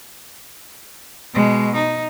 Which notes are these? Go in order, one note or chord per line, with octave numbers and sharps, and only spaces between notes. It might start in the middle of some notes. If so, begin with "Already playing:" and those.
B2 G#3
D#4